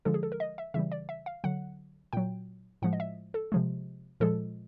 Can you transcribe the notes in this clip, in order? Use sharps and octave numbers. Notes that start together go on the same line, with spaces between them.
D3 F3 G#3 A4
G#4
A4
A#4
D#5
E5
C#3 E3 G3 E5
D5
E5
F5
D3 F#3 F#5
A#2 F#3 G5
A2 F3 G#3 F#5
D#5
E5
A4
C3 F3 G#3
A#2 F3 G#3 A4